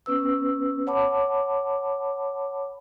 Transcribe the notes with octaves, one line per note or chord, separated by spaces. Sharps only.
B3 C#4 B4 E6
C#5 F#5 A5 B5 D6